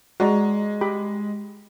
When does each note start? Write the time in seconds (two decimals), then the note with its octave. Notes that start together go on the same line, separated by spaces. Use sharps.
0.20 G#3 F#4 D5 A#5
0.81 G4 B5